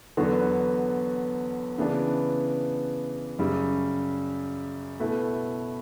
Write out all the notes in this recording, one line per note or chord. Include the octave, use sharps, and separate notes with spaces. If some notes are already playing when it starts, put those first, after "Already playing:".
E2 D3 F#3 B3 F#4
C#3 E3 B3 D4
F#2 C#3 G3
B2 A3 E4 B4